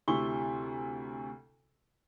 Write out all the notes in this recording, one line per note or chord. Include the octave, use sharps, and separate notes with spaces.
D2 C3 E4 C6 C#6 G7